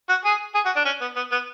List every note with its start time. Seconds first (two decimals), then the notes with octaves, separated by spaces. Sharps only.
0.09 F#4
0.25 G#4
0.55 G#4
0.65 F#4
0.76 D4
0.86 C#4
1.01 B3
1.16 B3
1.32 B3